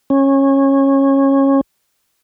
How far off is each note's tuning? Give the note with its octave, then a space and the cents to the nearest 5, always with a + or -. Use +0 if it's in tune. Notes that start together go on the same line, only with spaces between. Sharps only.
C#4 -20